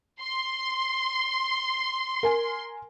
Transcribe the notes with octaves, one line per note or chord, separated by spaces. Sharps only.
C6
A#4 G#5